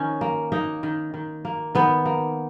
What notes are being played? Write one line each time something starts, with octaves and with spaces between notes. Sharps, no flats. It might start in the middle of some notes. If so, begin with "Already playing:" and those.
Already playing: D#3 C#4
A#3
A#3 D#4
D#3
D#3
A#3
D#3 B3
A#3